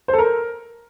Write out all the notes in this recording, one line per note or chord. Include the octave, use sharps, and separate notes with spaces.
C5
A4
A#4